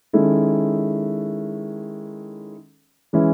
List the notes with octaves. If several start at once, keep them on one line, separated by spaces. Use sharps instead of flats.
D#3 G#3 C#4 E4 A4
E3 G#3 C#4 E4